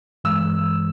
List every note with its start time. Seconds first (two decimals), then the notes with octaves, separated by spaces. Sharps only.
0.24 G2 E3 G#3 E6